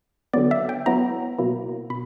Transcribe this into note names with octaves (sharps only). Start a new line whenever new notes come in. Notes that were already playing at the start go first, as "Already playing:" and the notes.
D3 F#3 B3 D5
E5
G5
F#3 B3 E4 A#5
B2 F#3 A#3 E4
B2 B5